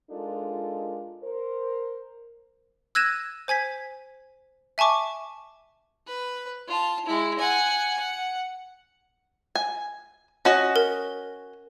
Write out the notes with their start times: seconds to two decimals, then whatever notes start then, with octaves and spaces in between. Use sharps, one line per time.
0.11 G#3 D4 D#4 F4 A4 A#4
1.24 A#4 C5
2.95 E6 F#6 G#6 A#6 D#7 E7
3.48 C5 G#5 G#6 B6
4.78 E5 G#5 A5 C#6 D6
6.07 B4
6.67 F4 A5
7.06 G#3 E4
7.39 F#5 G#5
7.98 F#5
9.55 G#5
10.45 C#4 F#4 D#5
10.76 A#4